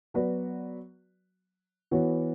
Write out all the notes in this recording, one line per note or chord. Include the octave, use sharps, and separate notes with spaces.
F#3 B3 F#4 B4 D5
E3 B3 F#4 C#5